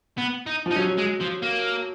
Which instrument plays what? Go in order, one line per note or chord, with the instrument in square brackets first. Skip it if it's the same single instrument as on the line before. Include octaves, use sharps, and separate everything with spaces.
[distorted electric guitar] B3
D#4
[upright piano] F3 [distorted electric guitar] D#4
[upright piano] F#3 [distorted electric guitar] C#4
[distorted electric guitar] G#3
F3
A#3